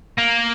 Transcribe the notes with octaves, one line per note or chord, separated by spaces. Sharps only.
A#3